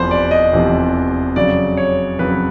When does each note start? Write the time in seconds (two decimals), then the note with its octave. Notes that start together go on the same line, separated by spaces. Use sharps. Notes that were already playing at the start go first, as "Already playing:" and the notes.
Already playing: F1 E2 C3 F3 B4 C5
0.11 D5
0.31 D#5
0.52 F1 E2 C3 F3
1.36 F2 C#3 F#3 D5
1.77 C#5
2.19 F2 C#3 F#3 B4